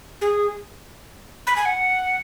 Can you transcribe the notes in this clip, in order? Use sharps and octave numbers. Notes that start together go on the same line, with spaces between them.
G#4
B5
G#5
F#5